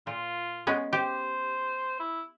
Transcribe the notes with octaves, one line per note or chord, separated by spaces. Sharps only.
A#2 F4
G#3 B3 C#4
G4 C5
E4